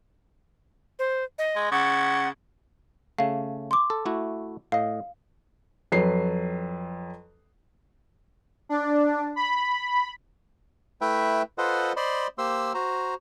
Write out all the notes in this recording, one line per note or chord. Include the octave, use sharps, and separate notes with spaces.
C5
D#5
G#3
C#3 F#5
C#3 A3 F5
C6 D6
A4
A3 E4 F#4
A2 D#5 F5
F2 F#3 B4 C7
D4
B5
A3 E4 B4 E5 G5
F4 A4 B4 C5 D#5 F#5
C5 D5 D#5 B5 C6
A#3 G4 C5 C6 E6
F#4 C5 A#5